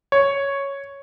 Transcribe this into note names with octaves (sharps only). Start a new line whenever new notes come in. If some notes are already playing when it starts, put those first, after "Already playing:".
C#5